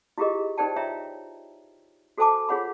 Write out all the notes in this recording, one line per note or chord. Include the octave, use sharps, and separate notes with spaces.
E4 F4 G4 G#4 A#4 D#5
D#4 A#4 C5 D5 G5 A5
F4 C#5 E5 G5 A#5
F#4 A4 C5 G#5 A5 D6
F4 G#4 C#5 F#5 B5